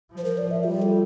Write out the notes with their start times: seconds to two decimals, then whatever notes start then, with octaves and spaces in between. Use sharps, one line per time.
0.12 F3
0.18 C5
0.25 A#4
0.38 D5
0.51 E5
0.64 G3 F4
0.82 A4